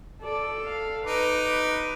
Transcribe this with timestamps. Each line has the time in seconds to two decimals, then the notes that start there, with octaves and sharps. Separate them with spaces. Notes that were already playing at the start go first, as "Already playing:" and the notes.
0.24 A4 D5
0.65 F5
1.06 D#4 B4 D6